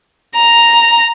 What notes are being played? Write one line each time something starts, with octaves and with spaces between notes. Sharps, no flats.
A#5